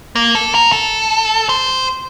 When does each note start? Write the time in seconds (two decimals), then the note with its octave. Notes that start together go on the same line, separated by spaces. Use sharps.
0.16 A#3
0.35 A4
0.55 A#4
0.72 A4
1.49 C5